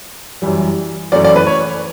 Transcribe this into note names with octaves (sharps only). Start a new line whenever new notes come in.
F#2 E3 G3
F#2 E3 A3 C#4 D5
D5
B4
C#5